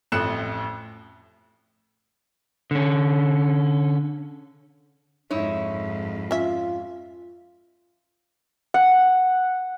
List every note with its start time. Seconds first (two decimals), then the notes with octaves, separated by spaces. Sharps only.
0.12 A1 F2 A2 F#6 C#7 E7
2.71 D3 C#4
5.30 F2 G#2 D#4 E4 C#5
6.31 C#4 F4 E5
8.74 F#5